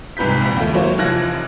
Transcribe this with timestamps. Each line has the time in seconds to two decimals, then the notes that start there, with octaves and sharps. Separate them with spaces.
0.17 C2 G#2 B4 G6 B6
0.42 A#1 B5
0.56 D#2 A3
0.74 F#3 A#3 E4 C5 C#5
0.98 F1 E3 F3 F#6 G#6 A#6